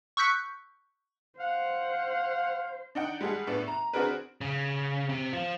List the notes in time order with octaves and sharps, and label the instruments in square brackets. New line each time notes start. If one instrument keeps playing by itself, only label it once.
[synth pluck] C#6 E6 F#6 G6 B6 C#7
[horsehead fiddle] C5 [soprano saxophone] F5 [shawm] F#5
[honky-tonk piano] D4 D#4 F#5 G5
G3 G#3 G#4 A4 F#5
A2 B3 D4
A#5
C4 D4 F#4 G#4 A#4 B4
[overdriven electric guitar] C#3
C3
F3